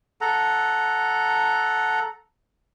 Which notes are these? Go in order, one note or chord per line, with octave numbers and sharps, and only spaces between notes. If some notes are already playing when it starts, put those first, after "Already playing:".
A4 F#5 A#5